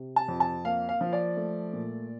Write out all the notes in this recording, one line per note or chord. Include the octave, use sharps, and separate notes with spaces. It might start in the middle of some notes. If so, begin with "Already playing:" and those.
Already playing: C3
A5
F2
A5
A#3 F5
F5
F3
D5
A3
A#2